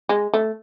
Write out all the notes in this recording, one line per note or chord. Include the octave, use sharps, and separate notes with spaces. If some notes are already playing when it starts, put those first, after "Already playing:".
G#3
A3